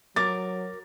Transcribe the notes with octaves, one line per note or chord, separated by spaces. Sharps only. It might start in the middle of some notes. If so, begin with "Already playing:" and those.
F#3 A#4 D6 A6